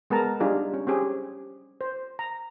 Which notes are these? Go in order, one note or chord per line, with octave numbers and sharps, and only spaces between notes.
G#3 B3 A#4 A5 A#5
G3 D4 D#4 F4 G#4
C#4
C4 C#4 G4 G#4
C5
A#5